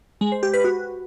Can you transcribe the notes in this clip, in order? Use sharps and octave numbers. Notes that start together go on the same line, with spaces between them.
G#3
C5
G4
B4
F#4